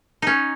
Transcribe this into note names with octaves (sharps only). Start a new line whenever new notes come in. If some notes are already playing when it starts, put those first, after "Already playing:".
C#4 D#4